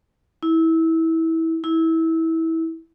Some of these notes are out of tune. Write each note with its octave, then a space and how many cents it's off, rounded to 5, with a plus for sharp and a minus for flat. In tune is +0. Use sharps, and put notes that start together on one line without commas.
E4 -20
E4 -20